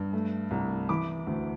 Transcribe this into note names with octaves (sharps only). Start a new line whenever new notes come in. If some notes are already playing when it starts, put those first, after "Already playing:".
Already playing: G2
A3
C2
E3 B5 D6
D2